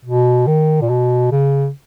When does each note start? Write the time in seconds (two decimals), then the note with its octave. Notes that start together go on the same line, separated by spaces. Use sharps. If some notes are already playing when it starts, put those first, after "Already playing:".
0.05 B2
0.47 D#3
0.81 A#2
0.89 B2
1.31 C#3